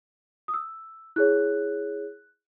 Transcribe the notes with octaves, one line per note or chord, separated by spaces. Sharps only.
D#6
E6
E4 G#4 C#5 F#6